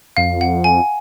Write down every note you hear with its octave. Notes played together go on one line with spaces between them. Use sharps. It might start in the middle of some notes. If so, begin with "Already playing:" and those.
F2 F5
F#5
G#5